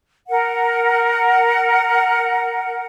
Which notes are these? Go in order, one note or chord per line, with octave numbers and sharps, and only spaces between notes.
A#4 F#5